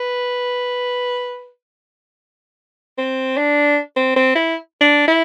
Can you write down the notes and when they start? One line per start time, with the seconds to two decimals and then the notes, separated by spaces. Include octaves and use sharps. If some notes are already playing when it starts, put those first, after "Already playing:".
Already playing: B4
2.98 C4
3.37 D4
3.97 C4
4.16 C4
4.35 E4
4.81 D4
5.08 E4